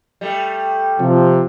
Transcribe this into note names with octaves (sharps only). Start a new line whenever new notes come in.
G3 A3
C3 F3